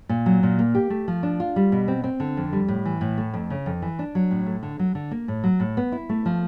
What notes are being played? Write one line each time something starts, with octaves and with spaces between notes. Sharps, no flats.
A#2
F#3
A#2
A#3
G4
A3
F3
D4
F4
G3
B2
C4
C4
D3
F2
G3
A2
E3
A2
A3
F2
C#3
F2
E3
D4
F#3
A2
A3
D3
F#3
D3
A#3
A2
F#3
A2
B3
E4
A3
F3